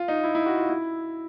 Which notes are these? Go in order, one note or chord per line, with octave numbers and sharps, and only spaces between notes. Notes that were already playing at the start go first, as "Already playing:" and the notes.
Already playing: F4
D#4
E4
E4
F#4
F4
E4